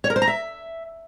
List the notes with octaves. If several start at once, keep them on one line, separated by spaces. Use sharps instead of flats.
C#5
A#4
C5
A#5
E5